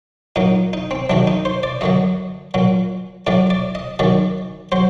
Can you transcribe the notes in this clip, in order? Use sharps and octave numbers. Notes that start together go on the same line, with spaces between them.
A#2 F#3 D#4
D#4
C4
F#2 D#3 F#3 D4
D#4
C5
D5
F#2 D3 F#3 D#5
A#2 F#3
A2 F#3 D5
D5
D#5
F#2 D#3 F#3 D5
F#3 C5